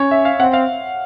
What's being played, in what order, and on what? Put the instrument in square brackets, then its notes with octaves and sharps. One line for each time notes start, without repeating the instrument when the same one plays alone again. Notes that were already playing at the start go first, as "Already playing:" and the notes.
Already playing: [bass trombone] C#4 [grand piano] C#5
[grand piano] E5
F5
[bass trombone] C4 [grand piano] F#5
[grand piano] F5